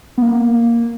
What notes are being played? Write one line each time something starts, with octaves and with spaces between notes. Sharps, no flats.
B3
A#3